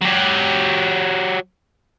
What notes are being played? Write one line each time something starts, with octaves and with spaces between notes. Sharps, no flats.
F#3 G4